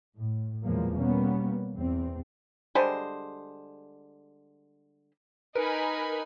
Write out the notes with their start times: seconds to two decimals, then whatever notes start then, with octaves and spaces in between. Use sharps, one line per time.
0.17 A2
0.64 E2 A#2 F3 F#3 G#3 A#3
0.96 B2 G3 A#3 B3 C#4
1.75 E2 C4
2.75 D3 G3 G#3 C5
5.55 D#4 A#4 B4 G#5 B5